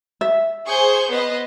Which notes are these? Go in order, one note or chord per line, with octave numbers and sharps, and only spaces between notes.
E5
G#4 C5 C#6 G6
B3 B4 C5 D#5